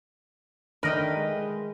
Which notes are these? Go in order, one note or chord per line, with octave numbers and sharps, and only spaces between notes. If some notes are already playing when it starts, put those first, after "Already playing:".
D#3 A3 D4 A#4 B4 D#5 G5
G#3